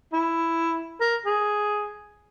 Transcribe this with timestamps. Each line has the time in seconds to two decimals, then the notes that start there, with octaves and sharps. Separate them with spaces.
0.13 E4
1.00 A#4
1.25 G#4